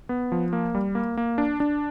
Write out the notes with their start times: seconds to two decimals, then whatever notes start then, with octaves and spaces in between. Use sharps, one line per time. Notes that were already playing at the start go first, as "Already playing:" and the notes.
0.09 B3
0.32 F3
0.53 A#3
0.75 G3
0.95 A#3
1.17 A#3
1.38 D4
1.60 D4